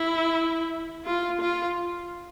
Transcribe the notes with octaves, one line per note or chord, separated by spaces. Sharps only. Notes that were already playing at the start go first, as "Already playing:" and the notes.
Already playing: E4
F4
F4